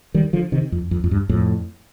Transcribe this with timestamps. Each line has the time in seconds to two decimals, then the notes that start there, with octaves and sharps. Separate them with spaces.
0.14 D#3 G3
0.33 D3 F3
0.52 C3 D#3
0.72 F2
0.91 F2
1.04 F2
1.11 G2
1.29 F2 A2